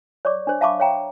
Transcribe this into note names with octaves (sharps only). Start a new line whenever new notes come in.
C#5 D5 C#6 D6
D4 C5
E5 F5 A5 B5 C#6 D6
C#5 F5 G5 A#5